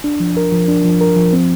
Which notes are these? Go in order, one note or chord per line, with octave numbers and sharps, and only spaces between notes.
D4
F3
A#4
F3
D4
F3
A#4
F3
C4